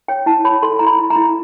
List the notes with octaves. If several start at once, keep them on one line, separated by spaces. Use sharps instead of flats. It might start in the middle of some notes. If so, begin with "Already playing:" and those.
C#5 G5
E4 A5
C#5 B5
A4 C6
E4 A#5
B5
E4
A#5
E4